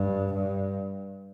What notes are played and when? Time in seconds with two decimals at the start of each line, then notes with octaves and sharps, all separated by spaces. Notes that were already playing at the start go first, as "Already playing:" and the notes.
Already playing: G2
0.34 G2